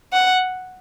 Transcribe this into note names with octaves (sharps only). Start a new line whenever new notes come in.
F#5